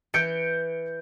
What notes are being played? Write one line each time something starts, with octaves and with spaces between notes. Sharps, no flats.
E3 G6 C#7 D7